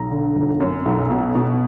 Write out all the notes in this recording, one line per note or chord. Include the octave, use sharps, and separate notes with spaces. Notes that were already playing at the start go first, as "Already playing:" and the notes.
Already playing: B1 A#5
D3
G1
F#2
B1
B2
B2